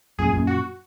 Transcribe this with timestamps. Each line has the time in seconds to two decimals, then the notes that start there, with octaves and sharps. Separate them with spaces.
0.19 F#2 A#2 G#4
0.33 F#2 A#2
0.47 F#4